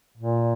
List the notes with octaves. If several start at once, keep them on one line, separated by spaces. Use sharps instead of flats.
A#2